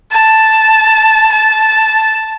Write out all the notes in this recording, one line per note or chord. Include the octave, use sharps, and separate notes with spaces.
A5
A5